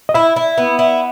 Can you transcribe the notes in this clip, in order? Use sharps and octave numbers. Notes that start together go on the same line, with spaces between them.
D#5
E4 E5
E4
B3
E4